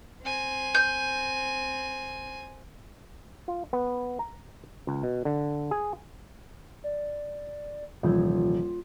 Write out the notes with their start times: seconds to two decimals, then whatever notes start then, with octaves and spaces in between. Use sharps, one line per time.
0.22 C4 G#5
0.75 G6
3.48 F4
3.73 B3
4.19 A#5
4.87 C#2
5.03 B2
5.25 D3
5.71 G#4
6.84 D5
8.03 D#1 C3 E3 F3 F4